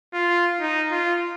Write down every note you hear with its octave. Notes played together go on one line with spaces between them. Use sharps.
F4
D#4
F4